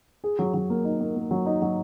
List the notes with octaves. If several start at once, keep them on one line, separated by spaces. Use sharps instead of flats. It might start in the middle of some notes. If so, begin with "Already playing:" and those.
G#4
F#3
F#3
A#3
D#4
A#3
A#3
F#3
D#4
F#3